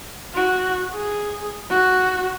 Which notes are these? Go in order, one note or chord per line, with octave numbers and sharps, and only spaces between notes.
F#4
G#4
F#4